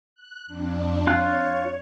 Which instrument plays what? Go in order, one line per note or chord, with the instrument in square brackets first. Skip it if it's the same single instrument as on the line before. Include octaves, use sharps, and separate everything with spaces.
[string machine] F#6
F2 D4
[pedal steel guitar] F4 F5 F#6 [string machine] C#5